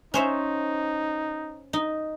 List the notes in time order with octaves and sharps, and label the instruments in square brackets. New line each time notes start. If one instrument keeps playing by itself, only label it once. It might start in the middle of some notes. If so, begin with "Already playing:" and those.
[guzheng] C#4 C5 E5 [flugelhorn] D#4
[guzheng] D#4